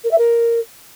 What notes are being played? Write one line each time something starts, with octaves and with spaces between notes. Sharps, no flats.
A#4
E5
A#4